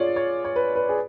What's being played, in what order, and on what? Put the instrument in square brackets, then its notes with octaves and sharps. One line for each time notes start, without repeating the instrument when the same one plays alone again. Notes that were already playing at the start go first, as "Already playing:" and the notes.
Already playing: [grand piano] F4 G#4 C#5 D5
C#5
C#5
B4
B4
G#4